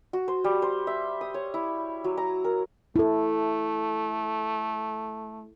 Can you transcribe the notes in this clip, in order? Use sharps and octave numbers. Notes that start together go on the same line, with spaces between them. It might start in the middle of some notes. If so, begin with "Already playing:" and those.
F#4
C5
G3
C5
E5
D#6
C#5
E4
F#3
A#5
A#4
A3 E4 A4